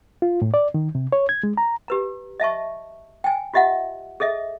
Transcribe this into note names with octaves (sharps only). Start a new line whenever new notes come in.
F4
A2
D5
D#3
C3
C#5
G#6
G#3
A#5
G4 B4 A#5
D#5 E5 A5 C#6
G5 G#5
F4 G4 D#5 E5 F#5
G#4 A4 D#5 E5